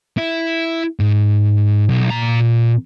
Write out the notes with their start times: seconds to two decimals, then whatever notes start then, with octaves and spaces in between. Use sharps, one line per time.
0.18 E4
0.99 G#2
1.89 B1
2.10 A#2 A#5